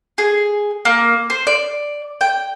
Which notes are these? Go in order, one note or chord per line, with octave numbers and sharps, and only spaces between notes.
G#4
A#3
C5
D5
G5